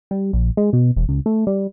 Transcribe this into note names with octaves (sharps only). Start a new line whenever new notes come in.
G3
A#1
G#3
B2
E1
C#2
A3
G3